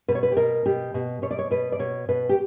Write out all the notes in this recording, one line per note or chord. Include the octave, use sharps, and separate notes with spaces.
B2 B4
C#5
B4
G4
B2 A#4
B2 G4
B2
B2 C#5
D5
C#5
B2 B4
D5
B2 C#5
B2 B4
G4